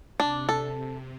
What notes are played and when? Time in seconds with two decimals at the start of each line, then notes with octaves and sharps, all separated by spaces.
0.19 C3 D4
0.49 A4